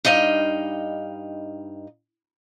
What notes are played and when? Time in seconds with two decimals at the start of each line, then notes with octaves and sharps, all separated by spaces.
0.05 G2 D#4 D#5 F5 G5